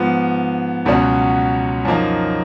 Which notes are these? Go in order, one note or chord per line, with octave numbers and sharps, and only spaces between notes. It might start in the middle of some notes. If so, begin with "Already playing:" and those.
Already playing: G#2 F3 B3
C#2 B2 F#3 C#4 F#4
F#2 F3 A#3 D#4